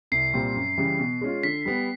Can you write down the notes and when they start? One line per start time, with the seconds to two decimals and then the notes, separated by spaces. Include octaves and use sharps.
0.12 C2 C7
0.34 A#2 G3 C4
0.56 F#2
0.78 C#3 E3 G3
0.99 B2
1.21 G#3 C#4 F4
1.43 D3 B6
1.66 G3 B3